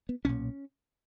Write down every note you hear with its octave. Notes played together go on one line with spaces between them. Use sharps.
B3
B1 A#2 C#4